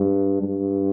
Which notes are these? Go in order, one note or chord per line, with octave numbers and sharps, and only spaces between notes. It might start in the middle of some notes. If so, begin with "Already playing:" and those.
Already playing: G2
G2